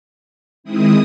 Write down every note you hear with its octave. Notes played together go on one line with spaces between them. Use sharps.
D#3 G#3 C4 E4 D#6